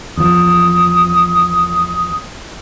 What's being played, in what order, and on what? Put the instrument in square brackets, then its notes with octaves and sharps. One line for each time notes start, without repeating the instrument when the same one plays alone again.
[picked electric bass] E2 F3 [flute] D#6